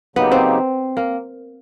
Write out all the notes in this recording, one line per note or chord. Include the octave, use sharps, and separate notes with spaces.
C#3 F#3 A#3 B3 D#4 G4
C4
A#3